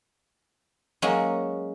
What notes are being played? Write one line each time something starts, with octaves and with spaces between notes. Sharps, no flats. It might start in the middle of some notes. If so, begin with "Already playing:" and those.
F#3 G#3 A#3 C#4 F#4